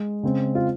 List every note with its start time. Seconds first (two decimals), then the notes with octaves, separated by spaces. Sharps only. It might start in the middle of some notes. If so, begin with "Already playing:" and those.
Already playing: G#3
0.23 C#3 G#3 C4
0.55 F4